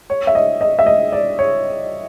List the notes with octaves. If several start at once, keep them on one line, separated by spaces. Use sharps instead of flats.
C#5
E5
D#5
D#5
E5
D#5
D5
C#5